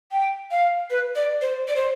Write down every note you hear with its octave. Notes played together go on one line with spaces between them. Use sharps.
G5
F5
B4
D5
C5
D5
C5